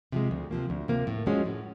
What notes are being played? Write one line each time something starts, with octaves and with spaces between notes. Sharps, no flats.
C3 F3 G#3
D2
C3 F3 A#3
D2
C3 F3 A#3
A2
F3 G#3 C#4 F#4
A2